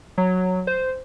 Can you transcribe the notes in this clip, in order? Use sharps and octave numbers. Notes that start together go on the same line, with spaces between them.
F#3
C5